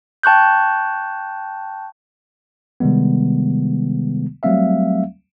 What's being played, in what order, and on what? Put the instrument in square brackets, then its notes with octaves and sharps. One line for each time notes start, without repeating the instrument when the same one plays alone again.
[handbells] G5 A5 C#6 F#6 G6
[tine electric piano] C3 D#3 G3 G#3 B3
F#3 G3 A3 C4 E5 F5